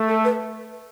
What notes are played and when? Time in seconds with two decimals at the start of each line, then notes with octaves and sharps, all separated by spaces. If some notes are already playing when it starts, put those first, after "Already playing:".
Already playing: A3
0.08 A4
0.24 B4